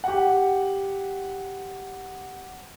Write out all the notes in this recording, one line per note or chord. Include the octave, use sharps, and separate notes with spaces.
G4 F#5